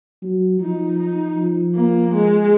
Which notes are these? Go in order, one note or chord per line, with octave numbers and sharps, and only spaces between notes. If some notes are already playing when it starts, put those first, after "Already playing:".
F#3
F3 D#4
D#4
F3
A#3
G#3